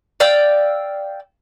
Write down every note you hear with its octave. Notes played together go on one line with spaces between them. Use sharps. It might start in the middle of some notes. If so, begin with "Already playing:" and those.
D5 F5 G5 E6